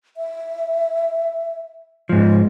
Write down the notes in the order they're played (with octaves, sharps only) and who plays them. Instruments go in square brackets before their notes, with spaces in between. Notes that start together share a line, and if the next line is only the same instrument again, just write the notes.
[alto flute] E5
[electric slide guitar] G#2 F3 [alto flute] G#3